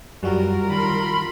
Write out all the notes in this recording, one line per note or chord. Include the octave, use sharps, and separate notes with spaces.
F#2 F#3 G3 F4 F#4 A#4
D#3 B5 C6